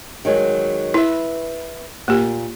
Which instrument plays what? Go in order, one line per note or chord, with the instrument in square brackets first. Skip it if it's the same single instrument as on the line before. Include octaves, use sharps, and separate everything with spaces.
[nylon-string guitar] D#3 F#3 G#3
[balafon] E4 [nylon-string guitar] B4 E5
[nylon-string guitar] A#2 [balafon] A#3 G4